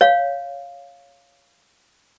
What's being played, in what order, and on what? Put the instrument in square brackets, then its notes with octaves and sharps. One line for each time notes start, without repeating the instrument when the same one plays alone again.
[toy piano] C#5 F5